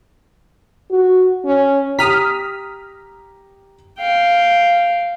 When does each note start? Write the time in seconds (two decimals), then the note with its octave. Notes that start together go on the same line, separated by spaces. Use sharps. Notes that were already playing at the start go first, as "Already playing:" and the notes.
0.90 F#4
1.45 C#4
1.99 G4 A#5 D#6 F6 B6
3.99 F5 G5